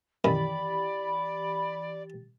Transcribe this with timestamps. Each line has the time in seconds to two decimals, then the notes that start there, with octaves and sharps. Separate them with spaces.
0.24 F#2 D#3 E3 G4 D5 B5 A6